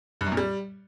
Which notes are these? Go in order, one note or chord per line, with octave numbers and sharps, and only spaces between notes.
G2
F#2
A#2
G3